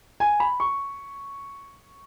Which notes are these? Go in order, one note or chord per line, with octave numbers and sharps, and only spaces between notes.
G#5
B5
C#6